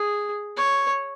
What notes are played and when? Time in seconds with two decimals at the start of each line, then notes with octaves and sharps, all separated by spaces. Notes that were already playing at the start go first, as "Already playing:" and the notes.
Already playing: G#4
0.57 C#5